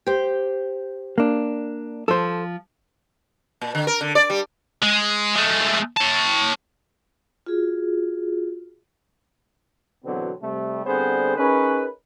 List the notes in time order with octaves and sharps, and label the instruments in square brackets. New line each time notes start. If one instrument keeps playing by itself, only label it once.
[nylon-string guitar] G4 C5
[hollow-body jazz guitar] A#3 D4
[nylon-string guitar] F3 [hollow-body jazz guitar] A4 C5
[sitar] A#2
D3
A#4
D3
D5
G3
[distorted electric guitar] G#3
G#3 A3
C#5 A5
[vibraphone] F4 F#4 G#4
[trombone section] E2 B2 D3 F#3 B3 C4
C3 G3 A3
D3 G3 B3 C4 G#4 C5
C#4 D#4 G#4 A#4 B4